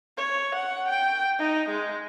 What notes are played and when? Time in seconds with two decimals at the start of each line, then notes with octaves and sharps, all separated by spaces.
0.18 C#5
0.56 F#5
0.89 G5
1.39 D#4
1.70 G#3